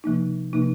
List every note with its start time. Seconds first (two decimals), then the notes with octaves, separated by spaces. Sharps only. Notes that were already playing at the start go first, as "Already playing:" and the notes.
0.04 C3 F3 A#3 D#4
0.53 C3 F3 A#3 D#4